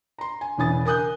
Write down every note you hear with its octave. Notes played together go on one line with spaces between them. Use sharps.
A#5 C6
G#5
E1 C#3 E3 G#5 D#6 A6
A#4 G#5 D#6 F#6 G6